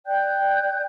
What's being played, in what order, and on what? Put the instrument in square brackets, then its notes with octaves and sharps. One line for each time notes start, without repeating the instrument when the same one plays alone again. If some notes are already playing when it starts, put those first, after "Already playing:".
[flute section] D5 G5 F#6 G6